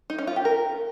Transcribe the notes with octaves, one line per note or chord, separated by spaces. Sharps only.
D#4
C#4
F4
G4
A#4